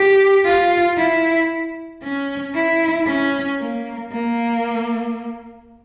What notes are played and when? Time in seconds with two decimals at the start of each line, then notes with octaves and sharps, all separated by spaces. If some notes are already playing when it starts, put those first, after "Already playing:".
Already playing: G4
0.45 F4
0.97 E4
2.03 C#4
2.55 E4
3.07 C#4
3.60 A#3
4.12 A#3